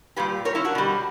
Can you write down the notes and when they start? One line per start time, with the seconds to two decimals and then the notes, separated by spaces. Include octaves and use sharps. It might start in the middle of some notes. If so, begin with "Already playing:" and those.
0.16 A#2 G3 G4 B4
0.45 A#4 C#5
0.55 C#4 E4
0.65 D4 F#4
0.75 B2 G3